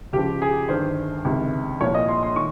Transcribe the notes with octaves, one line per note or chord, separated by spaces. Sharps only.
C#2 C#3 F3 G4
G#4
G1 G2 D#3 C5
C#2 C3 D#3
C2 A#2 F3 C#5
D#5
C6
C6
D#3 C#6